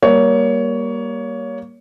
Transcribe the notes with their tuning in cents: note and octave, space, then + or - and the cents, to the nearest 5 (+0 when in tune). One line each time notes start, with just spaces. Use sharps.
G3 +0 A#3 +20 C#5 +20